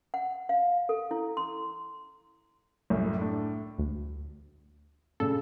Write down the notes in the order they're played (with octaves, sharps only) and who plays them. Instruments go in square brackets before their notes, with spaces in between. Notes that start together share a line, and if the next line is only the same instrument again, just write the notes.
[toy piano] F#5
F5
A4
E4
C6
[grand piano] C2 F#2 A2
A2 D4
[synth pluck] D2
[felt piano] A#2 C#3 [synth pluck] A4